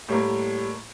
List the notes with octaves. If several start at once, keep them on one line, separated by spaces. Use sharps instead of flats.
A2 G3 A#3